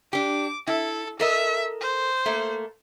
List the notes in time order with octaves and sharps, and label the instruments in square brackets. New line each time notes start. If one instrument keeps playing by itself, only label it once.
[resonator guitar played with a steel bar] D4 G4 [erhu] D6
[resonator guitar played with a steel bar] E4 [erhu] A4
[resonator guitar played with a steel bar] A4 A#4 D#5 [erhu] E5
[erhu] C5
[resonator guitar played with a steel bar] A3 A#3